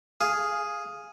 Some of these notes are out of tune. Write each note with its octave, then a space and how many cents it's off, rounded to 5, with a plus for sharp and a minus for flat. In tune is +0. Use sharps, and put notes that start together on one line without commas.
G#4 +0 F5 +0